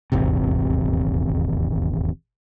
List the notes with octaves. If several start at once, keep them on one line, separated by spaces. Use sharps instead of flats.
D#1 G#1 E2 C3